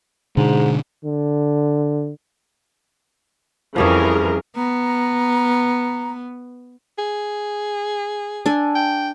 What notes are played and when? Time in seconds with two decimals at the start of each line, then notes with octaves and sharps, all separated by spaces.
0.37 G#2 B2 D3
1.05 D3
3.76 F2 E3 F3 G3 C#4 G#4 A#4
4.56 B3 A#5
6.99 G#4
8.46 D4 A4 G#5
8.75 G5